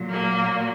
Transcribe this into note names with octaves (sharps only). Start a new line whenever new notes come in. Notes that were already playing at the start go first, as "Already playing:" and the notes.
Already playing: A#2 F#3
A#3